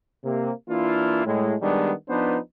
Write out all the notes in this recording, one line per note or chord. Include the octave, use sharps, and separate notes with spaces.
C3 A#3
E3 A#3 D4 E4 F4
A2 G#3
D#3 G3 G#3 B3 D4
F3 B3 D4 D#4 B4 C5